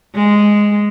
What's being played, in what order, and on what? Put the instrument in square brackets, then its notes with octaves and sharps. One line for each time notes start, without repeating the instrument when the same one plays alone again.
[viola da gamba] G#3